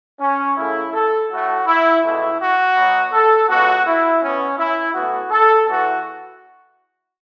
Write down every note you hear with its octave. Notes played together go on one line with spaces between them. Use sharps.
C#4
F#2 C#3 A3 E4
A4
A2 F#4
A3
E4
C#2 B2 A3 E4
F#4
B2 F#3 B3
A4
C#2 B2 B3 F#4
E4
B2 B3 C#4
E4
A2 E3 B3 F#4
A4
E2 E3 B3 F#4